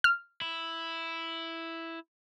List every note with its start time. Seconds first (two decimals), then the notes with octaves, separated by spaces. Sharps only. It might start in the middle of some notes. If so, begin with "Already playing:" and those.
0.04 F6
0.41 E4